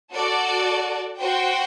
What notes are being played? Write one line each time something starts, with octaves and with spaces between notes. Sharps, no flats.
F#4 A4 D5
F#4 C5 G5